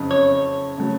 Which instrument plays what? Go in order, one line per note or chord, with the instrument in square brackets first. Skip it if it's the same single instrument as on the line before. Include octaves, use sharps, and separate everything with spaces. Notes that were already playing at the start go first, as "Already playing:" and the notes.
Already playing: [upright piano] F#1 F2 C#3
[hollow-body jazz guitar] C#5
[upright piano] C#3 F#3 A3